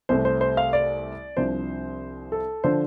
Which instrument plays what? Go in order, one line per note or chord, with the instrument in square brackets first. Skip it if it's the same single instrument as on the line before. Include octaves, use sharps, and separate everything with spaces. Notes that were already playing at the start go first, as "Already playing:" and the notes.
[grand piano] C2 C3 A3 C4 C5
C5
C5
F5
D5
C2 C3 F3 D4 C5
A4
D3 F3 D4 C5